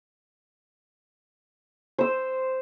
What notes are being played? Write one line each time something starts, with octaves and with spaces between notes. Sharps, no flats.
C5 E6